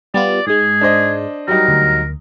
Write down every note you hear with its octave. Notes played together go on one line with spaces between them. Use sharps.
G3 B3 F4 D5
G#2 G#3 G#4
D4 C5 D#5
F#3 G3 D#4 A#4
D2